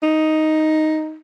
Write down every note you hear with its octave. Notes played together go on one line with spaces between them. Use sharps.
D#4